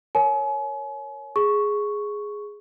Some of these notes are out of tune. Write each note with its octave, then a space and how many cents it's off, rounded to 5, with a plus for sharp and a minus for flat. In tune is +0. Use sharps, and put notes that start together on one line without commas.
A#4 +0 C#5 +0 G#5 +40
G#4 +0 C#6 +0